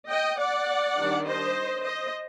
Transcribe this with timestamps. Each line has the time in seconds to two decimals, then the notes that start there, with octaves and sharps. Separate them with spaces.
0.09 D#5 G5
0.38 D5 F#5
0.96 D#3 G3 D4
1.25 C5 D#5
1.83 C5 D#5